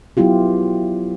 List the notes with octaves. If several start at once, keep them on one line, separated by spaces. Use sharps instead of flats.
F#3 B3 E4 F4 G4